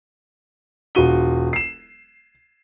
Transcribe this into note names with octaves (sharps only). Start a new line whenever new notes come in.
E1 F4 F#4 D#7 G7
C7 E7